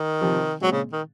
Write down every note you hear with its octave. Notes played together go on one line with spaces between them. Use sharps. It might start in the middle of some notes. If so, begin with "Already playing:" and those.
Already playing: D#3
C3 F3 C4
A#2 F#3 G#3 C4
C#3
D#3